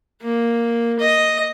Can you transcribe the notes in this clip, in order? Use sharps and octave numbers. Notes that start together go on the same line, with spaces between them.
A#3
D#5